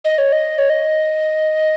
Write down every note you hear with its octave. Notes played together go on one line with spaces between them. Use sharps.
D#5
C#5
D#5
C#5
D#5